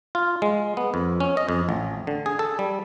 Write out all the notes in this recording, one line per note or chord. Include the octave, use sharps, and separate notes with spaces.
F4
G#3
B3
F2
C#4
D#5
F2
A1
D3
G#4
A4
G3